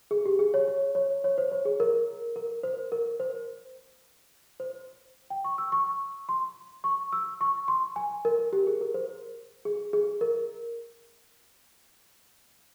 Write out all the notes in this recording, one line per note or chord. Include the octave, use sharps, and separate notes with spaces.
G#4
G4
G#4
C#5
C#5
C#5
C#5
C5
C#5
G#4
A#4
A#4
C5
A#4
C5
C5
G5
C#6
E6
C#6
C6
C#6
E6
C#6
C6
G#5
A#4
G4
G#4
A#4
C5
G#4
G#4
A#4